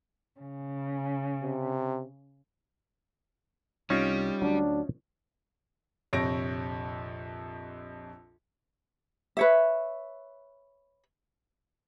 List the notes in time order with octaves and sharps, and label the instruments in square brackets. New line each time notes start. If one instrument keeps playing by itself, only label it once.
[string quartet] C#3
[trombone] C3
[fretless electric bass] C2 [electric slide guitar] G3 [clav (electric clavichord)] C#4 D#4 F4
[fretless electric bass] D2 F#3 [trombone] D4
[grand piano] A#1 F2 C3 C#5 A#6 D7
[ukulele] B4 C#5 E5